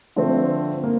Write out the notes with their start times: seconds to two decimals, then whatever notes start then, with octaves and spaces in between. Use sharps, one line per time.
0.16 D3 F3 A3 C4
0.84 A#3